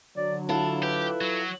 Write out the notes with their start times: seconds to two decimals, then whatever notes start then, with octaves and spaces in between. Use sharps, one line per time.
0.17 D3 F#3 D5
0.49 D4 E4 F4 A4
0.83 G4 B4
1.21 F#3